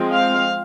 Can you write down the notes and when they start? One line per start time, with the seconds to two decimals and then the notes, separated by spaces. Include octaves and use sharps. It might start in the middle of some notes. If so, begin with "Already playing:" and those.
Already playing: F3 G#3 C4
0.15 F5